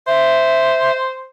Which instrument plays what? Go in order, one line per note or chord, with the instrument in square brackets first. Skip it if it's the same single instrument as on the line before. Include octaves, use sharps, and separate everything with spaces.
[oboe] C5 [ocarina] E5